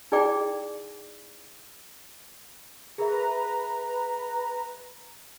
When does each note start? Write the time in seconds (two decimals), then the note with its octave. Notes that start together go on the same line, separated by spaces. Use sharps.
0.12 D#4 E4 G#4 D5 G5 D6
2.98 G#4 A#4 B4 E5 A#5